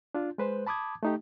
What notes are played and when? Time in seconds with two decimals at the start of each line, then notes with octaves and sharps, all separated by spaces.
0.15 D4 F4
0.38 G#3 B4 C5
0.67 A5 B5 D6 D#6 G#6
1.03 A3 D#4 G4